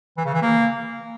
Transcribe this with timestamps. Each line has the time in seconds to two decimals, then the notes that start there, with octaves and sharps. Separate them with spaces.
0.17 E3
0.25 C#3
0.34 E3
0.42 A#3